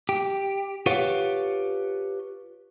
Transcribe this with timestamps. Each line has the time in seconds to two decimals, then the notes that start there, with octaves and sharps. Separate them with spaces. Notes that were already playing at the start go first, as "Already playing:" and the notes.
0.09 G4
0.86 F4 G4 B4 C#5 F5 F#5